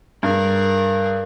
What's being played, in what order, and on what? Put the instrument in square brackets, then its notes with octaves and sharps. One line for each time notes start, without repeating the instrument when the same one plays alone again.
[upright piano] G2 [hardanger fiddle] G#4 A#4